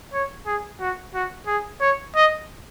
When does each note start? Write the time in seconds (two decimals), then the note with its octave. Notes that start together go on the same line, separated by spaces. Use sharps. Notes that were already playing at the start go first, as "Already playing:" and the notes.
0.13 C#5
0.46 G#4
0.80 F#4
1.14 F#4
1.47 G#4
1.81 C#5
2.16 D#5